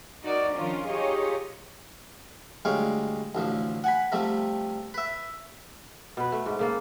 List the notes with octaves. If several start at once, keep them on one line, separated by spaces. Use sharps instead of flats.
D#4 F#4 A#4 D5
D#3 F3 C#4 D4 F4 A#4
D#4 F4 G4 G#4 C#5 D#5
D2 G3 G#3 C#5 F5 G5
A1 D2 F3
F#5 G#5 B5
C3 F3 G3 A3
B4 E5
B2 B4
A3
G#2
C#3 A#3 A4